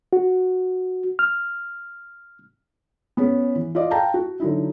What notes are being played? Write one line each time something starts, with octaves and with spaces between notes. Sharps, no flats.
F#4
F6
B3 C#4 G#4
E3
F4 D5 D#5
F5 G5 A5 A#5
F#4
D3 F#3 D#4 E4